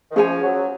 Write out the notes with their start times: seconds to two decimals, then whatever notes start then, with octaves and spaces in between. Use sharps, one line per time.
0.11 D#3
0.15 F3 C#4 G#4 C#5 G#5
0.41 F#3